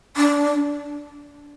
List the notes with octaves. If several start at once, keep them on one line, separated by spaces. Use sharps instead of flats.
D4